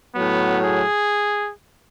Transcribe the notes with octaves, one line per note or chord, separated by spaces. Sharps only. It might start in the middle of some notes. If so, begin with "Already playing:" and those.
A2 F#3 B3
G#4